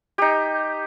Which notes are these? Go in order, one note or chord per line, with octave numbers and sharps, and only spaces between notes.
D#4 G4